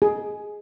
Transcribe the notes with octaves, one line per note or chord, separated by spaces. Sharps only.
G#4